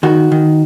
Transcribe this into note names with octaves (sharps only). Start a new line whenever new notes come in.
D#3 F#4
D#3